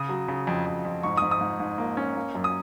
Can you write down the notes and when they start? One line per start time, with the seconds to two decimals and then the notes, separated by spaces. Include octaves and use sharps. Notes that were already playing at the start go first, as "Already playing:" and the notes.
Already playing: C#3 D#6
0.09 F#3
0.28 C#3
0.47 F2
0.66 F2
0.85 F2
1.03 G#2 C#6
1.17 G#2 D#6
1.31 D#6
1.41 G#2
1.60 G#2
1.78 A#3
1.97 C#4
2.16 A#3
2.35 F#2
2.44 D#6